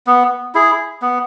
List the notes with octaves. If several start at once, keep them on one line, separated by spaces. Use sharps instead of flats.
B3
E4 G#4
B3